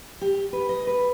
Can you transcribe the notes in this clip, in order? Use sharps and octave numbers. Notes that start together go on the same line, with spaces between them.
G4
B4
D#5
B4